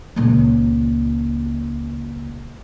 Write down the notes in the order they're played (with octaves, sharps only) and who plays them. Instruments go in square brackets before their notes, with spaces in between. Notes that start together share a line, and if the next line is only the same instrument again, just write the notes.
[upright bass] C#2 A#2